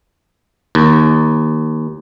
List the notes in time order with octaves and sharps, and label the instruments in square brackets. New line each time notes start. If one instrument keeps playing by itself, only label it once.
[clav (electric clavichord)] D#2